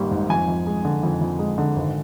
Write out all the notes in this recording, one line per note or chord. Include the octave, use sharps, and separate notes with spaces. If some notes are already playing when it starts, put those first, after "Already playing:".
Already playing: G#1 G#2 G3 A#3
G#2
F2 G#5
F2
G#3
D3
F2
F2
G#3
D3
G#1